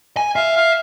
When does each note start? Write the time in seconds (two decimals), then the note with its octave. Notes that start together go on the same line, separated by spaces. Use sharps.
0.17 G#5
0.36 E5 F5
0.56 F5